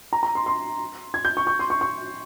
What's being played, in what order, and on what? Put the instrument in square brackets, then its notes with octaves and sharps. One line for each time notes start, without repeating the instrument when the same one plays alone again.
[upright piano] A#5
A#5
C6
C6
G#6
G6
C#6
C#6
C6
C#6
C#6